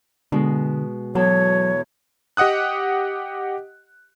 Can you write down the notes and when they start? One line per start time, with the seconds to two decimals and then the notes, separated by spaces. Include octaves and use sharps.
0.32 B2 D3 G#3
1.15 E2 F#3 A4 C#5
2.37 G4 D#5 F#5 D#6 F#6